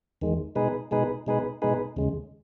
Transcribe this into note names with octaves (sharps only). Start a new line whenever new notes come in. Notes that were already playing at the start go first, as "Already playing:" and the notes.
E2 D#3 G#3
B2 G#3 D#4 G#4 B4
B2 G#3 D#4 G#4 B4
B2 G#3 D#4 G#4 B4
B2 G#3 D#4 G#4 B4
D#2 C#3 G#3